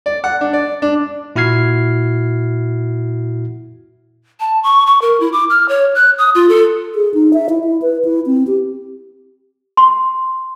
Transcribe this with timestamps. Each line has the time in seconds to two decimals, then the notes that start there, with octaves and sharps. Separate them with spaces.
0.06 D5
0.24 F#5
0.41 D4
0.53 D5
0.82 D4
1.36 A#2 E4 F#4 F6 G#6 C7
4.40 A5
4.63 C#6
4.86 C#6
5.02 A#4
5.20 E4
5.33 D6
5.50 F6
5.69 C#5
5.95 F#6
6.18 D#6
6.35 F4
6.49 A4
6.95 G#4
7.14 D#4
7.33 E5
7.49 E4
7.63 E4
7.82 B4
8.05 E4
8.26 C4
8.47 G4
9.77 C6